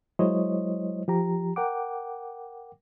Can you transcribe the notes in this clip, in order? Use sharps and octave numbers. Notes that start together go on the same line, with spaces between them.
F#3 G#3 E4 C5 C#5 D#5
F3 G4 A#5
A#4 F#5 G5 D6